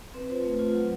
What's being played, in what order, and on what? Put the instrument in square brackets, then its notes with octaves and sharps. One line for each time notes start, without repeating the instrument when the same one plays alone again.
[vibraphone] C4 B4
F4 C5
A3
F4
F#3